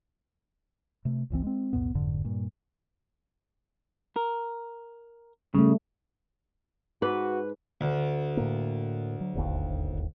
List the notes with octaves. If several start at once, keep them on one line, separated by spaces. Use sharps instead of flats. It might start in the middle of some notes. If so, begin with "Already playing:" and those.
C3 A3
G1 C#2 E3 C4
G#3 C4
B1 E2 A2 B3
F#1 F2 G#2 D3
G2 A#2
A#4
C#3 G3 A3
G#2 F#4 B4
D2
A2 A#3
F#3
D1 G1 D#2